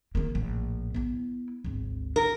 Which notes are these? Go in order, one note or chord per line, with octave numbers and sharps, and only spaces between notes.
D#3 A#3
A#1 A2
B3 E4
G#1 D2
A#4